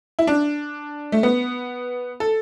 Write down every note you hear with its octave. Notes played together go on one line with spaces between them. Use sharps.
E4
D4
A3
B3
A4